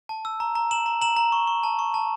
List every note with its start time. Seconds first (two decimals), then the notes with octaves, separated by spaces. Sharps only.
0.09 A5
0.25 E6
0.40 A#5
0.55 A#5
0.71 A#5 E7 F#7
0.86 A#5
1.01 A#5 E7 F#7
1.16 A#5
1.32 C#6
1.47 C#6
1.63 A5
1.79 C#6
1.94 A5